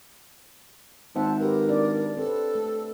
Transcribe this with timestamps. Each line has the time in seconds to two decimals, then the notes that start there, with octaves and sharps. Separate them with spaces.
1.16 G#1 C5 E5 F#5 A5
1.40 G4 A#4 B4
1.69 D4 D5
2.17 C4 A4 B4
2.55 A3